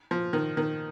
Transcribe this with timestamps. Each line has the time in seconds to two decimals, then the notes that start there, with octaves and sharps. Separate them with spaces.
0.11 F3
0.33 D#3
0.57 D#3